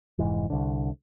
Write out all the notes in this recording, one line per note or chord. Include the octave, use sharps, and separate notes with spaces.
F1 G#2 E3
C2 D3